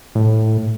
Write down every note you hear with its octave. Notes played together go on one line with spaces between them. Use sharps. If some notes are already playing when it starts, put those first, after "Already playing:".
A2